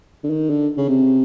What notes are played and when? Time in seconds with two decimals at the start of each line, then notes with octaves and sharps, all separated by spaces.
0.24 D3
0.30 D#3
0.50 D3
0.77 C#3
0.88 C3